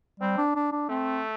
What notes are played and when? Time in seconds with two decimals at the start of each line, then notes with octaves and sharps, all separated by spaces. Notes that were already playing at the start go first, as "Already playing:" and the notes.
0.20 G3 C4
0.38 D4
0.56 D4
0.72 D4
0.90 A3 C4